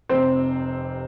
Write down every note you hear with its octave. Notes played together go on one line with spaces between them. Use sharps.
F1 F2 C3 C4 C5